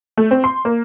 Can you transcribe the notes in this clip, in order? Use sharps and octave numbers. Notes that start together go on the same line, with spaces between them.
A3
C4
C6
A#3